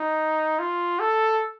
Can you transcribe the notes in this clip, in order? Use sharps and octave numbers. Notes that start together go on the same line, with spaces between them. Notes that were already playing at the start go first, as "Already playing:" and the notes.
Already playing: D#4
F4
A4